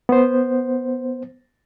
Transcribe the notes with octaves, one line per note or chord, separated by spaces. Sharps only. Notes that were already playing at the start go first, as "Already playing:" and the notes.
B3 C5